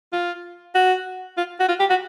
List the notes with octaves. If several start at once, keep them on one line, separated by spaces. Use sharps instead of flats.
F4
F#4
F4
F#4
F4
G4
F#4